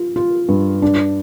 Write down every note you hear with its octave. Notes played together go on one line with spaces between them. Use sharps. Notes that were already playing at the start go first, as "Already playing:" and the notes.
Already playing: F4
F4
G2
D4